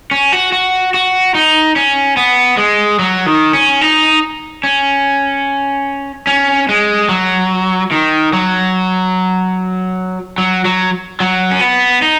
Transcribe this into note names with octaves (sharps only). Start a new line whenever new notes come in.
C#4
F#4
F#4
F#4
D#4
C#4
B3
G#3
F#3
D#3
C#4
D#4
C#4
C#4
G#3
F#3
D#3
F#3
F#3
F#3
F#3
C#4
B3
D#4